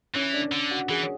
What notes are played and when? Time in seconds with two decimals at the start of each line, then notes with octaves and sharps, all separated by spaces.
0.14 E3 C#4
0.33 D4
0.52 D3
0.71 F#4
0.89 E3 G#4
1.03 C#5